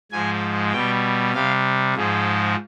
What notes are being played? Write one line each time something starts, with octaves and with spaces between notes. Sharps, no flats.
G#2 F3 G#3 G#5
B2 G3 G5
C3 G3 F5
G#2 F3 G#3